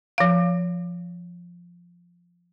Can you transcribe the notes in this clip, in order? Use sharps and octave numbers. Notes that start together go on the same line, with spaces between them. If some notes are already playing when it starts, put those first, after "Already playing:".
F3 F5